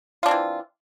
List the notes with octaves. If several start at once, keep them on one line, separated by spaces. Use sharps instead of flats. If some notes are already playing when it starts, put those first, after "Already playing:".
E3 C4 D4 F4